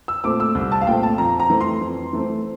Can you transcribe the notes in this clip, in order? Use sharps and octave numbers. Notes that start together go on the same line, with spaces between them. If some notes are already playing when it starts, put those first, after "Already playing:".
E6
A#2 A3 C4 D6
E6
C2
A5
F5
A#2 A3 C4 G5
A5
F2 A#5
A#5
E3 A3 C4
C6
F2
E3 A3 C4